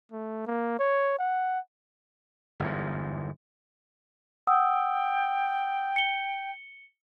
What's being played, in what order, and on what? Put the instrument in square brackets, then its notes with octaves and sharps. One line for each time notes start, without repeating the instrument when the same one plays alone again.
[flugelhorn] A3
A#3
C#5
F#5
[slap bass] G1 E2 G#2
[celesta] F#5 D#6 E6 [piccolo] G5
[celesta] C#7 G7